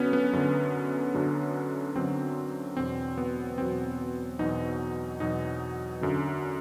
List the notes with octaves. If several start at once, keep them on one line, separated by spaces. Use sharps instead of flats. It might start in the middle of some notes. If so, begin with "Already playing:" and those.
Already playing: F#2 D3 F#3 B3 C#4
B3
F#2 D3 F#3
F#2 D3 F#3
F#2 D3 F#3 C4
E2 B2 F#3 C4
B3
E2 B2 F#3 C4
E2 B2 F#3 D#4
E2 B2 F#3 D#4
F#2 D3 F#3